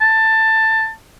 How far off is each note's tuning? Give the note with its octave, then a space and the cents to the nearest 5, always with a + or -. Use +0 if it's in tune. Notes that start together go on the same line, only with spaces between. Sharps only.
A5 +15